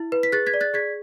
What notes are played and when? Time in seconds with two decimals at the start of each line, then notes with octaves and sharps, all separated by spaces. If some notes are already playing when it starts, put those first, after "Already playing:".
Already playing: E4
0.12 B4
0.23 B6
0.32 G#4 F#6 A6
0.46 G#6 B6
0.54 D5
0.61 F#6 A6
0.74 G#4 G#6 B6